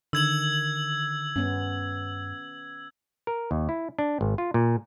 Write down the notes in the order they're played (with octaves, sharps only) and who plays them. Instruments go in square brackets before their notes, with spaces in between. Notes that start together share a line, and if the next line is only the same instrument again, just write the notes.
[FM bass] D3 [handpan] D#3 [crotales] E6 G#6 F#7
[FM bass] G2 [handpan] B3 C#4
[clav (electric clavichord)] A#4
D#2
E4
D4
G#1
F4
A#2